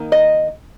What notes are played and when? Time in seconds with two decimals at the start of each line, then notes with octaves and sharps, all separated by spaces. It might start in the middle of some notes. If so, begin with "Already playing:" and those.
Already playing: D#3 A#3 D#4
0.12 D#5